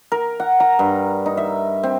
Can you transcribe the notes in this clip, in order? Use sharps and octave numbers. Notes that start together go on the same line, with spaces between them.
A#4
F#5
A#5
G2
D#4
E5
C4